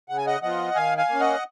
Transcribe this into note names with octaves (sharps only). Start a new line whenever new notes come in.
C#3 F#5
G#5
D#5 F#5
F3 B3 F4 D#5 F#5
D#3 F5 G#5
F5 G#5
A#3 C#4
D#5 F#5